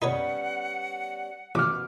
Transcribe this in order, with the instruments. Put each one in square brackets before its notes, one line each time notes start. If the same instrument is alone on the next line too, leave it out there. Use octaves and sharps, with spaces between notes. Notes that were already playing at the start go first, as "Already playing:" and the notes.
[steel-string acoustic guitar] G3 B3 C#4 [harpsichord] D#4 B4 C#5 [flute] F#5
[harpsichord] A1 [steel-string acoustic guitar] B2 [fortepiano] D6 F6